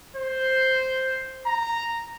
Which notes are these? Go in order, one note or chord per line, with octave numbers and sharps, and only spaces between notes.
C5
A#5